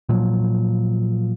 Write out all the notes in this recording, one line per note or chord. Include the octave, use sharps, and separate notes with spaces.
A#2 F3 F#3